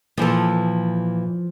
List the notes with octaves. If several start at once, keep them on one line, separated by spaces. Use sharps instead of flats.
A#2 E3 F3 A4